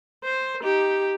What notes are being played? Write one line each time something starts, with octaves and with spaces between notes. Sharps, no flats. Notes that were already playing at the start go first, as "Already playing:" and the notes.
C5
D#4 G4